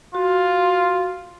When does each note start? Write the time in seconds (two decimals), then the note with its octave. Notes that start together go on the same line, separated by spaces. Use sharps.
0.15 F4 F#4